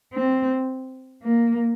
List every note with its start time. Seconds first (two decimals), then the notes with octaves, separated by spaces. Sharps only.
0.14 C4
1.23 A#3